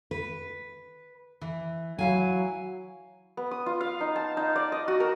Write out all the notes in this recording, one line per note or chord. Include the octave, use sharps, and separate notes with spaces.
B4
E3
F#3 E4 F5 G#5
B3
D#6
F4
F5
D#4
A5
D#4
D5
D#5
F#4
A#4